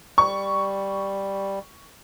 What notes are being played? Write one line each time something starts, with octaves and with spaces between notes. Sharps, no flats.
G3 C#6